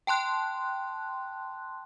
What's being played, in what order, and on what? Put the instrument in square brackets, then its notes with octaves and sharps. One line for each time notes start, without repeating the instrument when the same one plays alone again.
[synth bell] G5 A5 C6 F#6